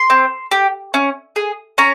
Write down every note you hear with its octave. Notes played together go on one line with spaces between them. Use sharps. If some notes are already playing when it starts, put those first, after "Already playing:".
Already playing: C6
C4
G4
C#4
G#4
C#4 A#5